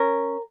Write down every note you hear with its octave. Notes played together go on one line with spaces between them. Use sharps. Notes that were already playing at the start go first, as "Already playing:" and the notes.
Already playing: C#4 A#4